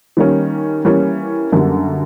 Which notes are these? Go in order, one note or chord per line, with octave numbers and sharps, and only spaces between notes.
D#3 G3 A#3 C#4
E3 G3 A#3 C#4
F#2 D3 G3 A#3